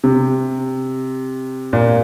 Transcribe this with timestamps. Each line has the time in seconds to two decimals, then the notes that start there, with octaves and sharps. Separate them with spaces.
0.04 C3
1.73 A#2